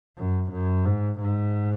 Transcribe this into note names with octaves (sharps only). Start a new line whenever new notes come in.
F#2
F#2
G#2
G#2